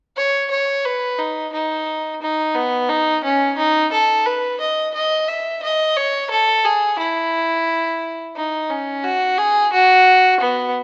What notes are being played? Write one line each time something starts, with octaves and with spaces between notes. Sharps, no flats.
C#5
C#5
B4
D#4
D#4
D#4
B3
D#4
C#4
D#4
A4
B4
D#5
D#5
E5
D#5
C#5
A4
G#4
E4
D#4
C#4
F#4
G#4
F#4
B3